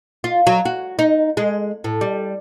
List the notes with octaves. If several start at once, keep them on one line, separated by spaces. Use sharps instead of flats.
F4
F#3
F#4
D#4
G#3
A2
G3